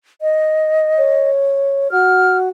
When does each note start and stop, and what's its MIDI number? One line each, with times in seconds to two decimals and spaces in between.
0.22 1.30 75
0.98 1.91 73
1.91 2.49 66
1.91 2.37 89